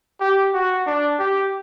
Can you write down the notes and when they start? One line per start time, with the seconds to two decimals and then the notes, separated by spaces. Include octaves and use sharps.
0.21 G4
0.54 F#4
0.87 D4
1.19 G4